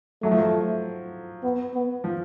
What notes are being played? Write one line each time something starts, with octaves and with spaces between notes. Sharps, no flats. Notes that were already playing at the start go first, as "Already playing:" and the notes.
F#3 A3
F3
F#3
B3
B3
F3